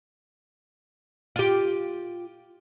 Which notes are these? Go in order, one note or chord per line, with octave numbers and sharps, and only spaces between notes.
F4 G4